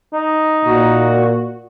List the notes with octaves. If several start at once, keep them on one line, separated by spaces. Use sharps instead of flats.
D#4
A#2 F#4